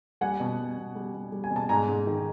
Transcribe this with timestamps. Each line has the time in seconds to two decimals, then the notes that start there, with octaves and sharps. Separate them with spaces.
0.21 G3 F#5 G#5
0.40 B2
0.58 G3
0.77 B2
0.95 G3
1.14 B2
1.32 G3
1.44 G#5
1.51 B2
1.56 A5
1.69 G#2 G#5 A#5
1.89 G#2
2.07 D#3